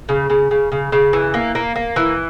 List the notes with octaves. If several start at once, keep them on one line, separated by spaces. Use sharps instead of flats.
C#3
C#3
C#3
C#3
C#3
E3
A#3
A#3
A#3
E3